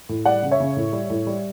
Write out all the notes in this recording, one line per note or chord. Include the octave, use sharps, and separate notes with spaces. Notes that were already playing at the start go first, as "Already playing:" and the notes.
A2
G3 D5 F#5
C#3
C#5 E5
C#3
A2
G3
A2
G3